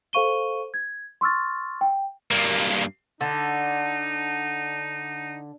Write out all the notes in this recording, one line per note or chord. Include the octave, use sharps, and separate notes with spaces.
A4 C5 F5 C#6 D#7 G7
G#6
C6 C#6 E6 F6 A6
G5
G2 A#3
D3 D#4